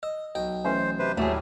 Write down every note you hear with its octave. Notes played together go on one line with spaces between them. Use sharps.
D#5 E6
B1 D#5 G5
E3 A3 C#4 C5
C3 B4 C5
D#2 A2 F#3 G3 A3 F#4 G#4